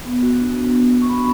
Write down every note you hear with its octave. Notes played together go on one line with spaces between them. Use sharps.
B3
F#4
D4
B3
B3
F#4
C#6
D4 B5